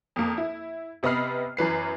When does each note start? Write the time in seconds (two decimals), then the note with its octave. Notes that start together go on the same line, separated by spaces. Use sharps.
0.16 F2 A#3
0.38 E4
1.03 C3 B3 D#5 B5 F6 C7
1.57 F#2 E3 B4 C7